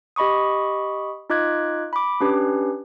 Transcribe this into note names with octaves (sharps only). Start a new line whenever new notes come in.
G4 D#5 B5 C#6 D#6
D#4 F4 D#5 D6 F#6 G#6
B5 D6
C#4 D4 G4 B4